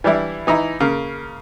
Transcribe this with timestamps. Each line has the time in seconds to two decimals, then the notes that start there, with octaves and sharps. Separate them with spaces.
0.04 E3 G3 D4 E4
0.47 E3 D#4 E4 A#5
0.80 C#3 A#3